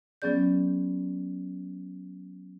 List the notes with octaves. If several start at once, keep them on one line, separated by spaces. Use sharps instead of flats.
F#3 B3 C#4 G#4 D5 G6